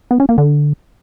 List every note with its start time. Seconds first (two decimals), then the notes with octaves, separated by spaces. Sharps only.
0.11 B3
0.20 C#4
0.29 A#3
0.38 D3